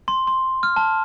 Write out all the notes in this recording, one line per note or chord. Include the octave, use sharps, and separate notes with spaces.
C6
C6
F6
A5